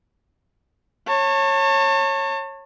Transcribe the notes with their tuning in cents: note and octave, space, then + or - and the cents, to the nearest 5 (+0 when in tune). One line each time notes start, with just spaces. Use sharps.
C#5 -20 A5 +35